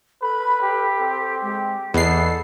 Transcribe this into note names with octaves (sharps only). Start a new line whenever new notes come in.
A4 B4 B5
G4
C4
G#3 G4
E2 B3 A4 D#5 C7